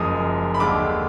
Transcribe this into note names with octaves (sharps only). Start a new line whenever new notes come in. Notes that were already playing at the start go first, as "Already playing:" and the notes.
Already playing: F#1 F#2 F3 G#3 D#6
B5
D#2 D3 G#3 D6